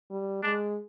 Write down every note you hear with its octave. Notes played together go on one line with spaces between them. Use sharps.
G3
G#3 D4